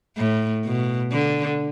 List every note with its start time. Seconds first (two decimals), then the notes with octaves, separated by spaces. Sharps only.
0.17 A2
0.64 B2
1.12 D3